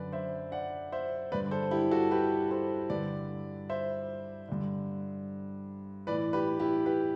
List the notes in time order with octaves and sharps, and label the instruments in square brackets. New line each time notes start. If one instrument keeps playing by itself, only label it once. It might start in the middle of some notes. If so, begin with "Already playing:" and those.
Already playing: [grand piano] F#2 D3 B4 D5
C5 E5
D5 F#5
C5 E5
G2 D3 B4 D5
A4 C5
E4 G4
F#4 A4
G4 B4
A4 C5
G2 D3 B4 D5
C5 E5
G2 D3
E3 B4 D5
A2
G4 B4
E4 G4
G4 B4